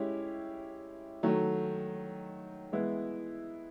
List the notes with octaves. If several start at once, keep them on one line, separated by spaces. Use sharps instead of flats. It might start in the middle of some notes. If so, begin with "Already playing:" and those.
Already playing: G#3 C#4 E4 G4
D#3 F#3 A3
E3 G#3 B3 E4